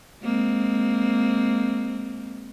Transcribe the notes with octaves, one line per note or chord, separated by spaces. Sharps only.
G#3 A#3 C4